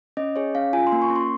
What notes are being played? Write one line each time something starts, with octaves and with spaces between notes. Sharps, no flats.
C#4 D#5
G#4 C#5
C#4 F5
F4 G#5
C6
A#3
C#6
C#4
C6